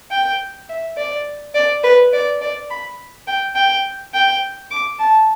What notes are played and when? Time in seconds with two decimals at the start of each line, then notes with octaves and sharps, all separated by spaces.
0.11 G5
0.69 E5
0.97 D5
1.55 D5
1.84 B4
2.13 D5
2.41 D5
2.70 B5
3.27 G5
3.55 G5
4.14 G5
4.71 D6
4.99 A5